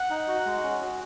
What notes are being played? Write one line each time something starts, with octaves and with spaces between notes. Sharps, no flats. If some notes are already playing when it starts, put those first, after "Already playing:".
Already playing: F#5
D#4
F#4
G#3
C#4
F#4